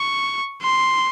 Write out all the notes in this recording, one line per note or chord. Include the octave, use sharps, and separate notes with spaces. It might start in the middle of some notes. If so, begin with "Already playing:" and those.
Already playing: C#6
C6